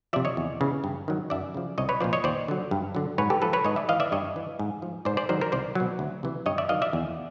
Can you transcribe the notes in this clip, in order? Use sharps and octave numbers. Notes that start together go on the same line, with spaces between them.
C3 F3 D5 E5
C#5 D#5
E2
C#3 E3
G2
D#3 F#3
F#2 D5 E5
C#3 F3
C2 C#5 D#5
B4 C#5
A#2 F3 C5 D5
C#5 D#5
D#2 C5 D5
D3 F#3
G2
D3 F#3
G#2 B4 C#5
G4 A4
F3 A4 B4
B4 C#5
G#2 C#5 D#5
D5 E5
E3 D#5 F5
D5 E5
G2 C#5 D#5
E3
G#2
F3
G#2 C5 D5
C5 D5
D#3 F#3 A#4 C5
A#4 C5
C2 C5 D5
B2 F#3
D2
C3 E3
G2 C#5 D#5
D5 E5
D#3 F#3 D#5 F5
D5 E5
E2